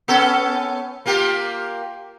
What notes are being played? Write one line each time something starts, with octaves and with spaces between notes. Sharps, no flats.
B3 C#4 A4
A#3 F4 G4